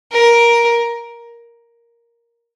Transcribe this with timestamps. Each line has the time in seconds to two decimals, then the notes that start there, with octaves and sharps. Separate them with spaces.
0.12 A#4